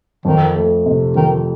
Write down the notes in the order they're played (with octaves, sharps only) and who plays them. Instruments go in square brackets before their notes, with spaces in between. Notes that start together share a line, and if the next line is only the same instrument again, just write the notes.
[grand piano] F2 [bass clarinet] D#3
[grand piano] A3
C3
[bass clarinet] D#3 [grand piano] F3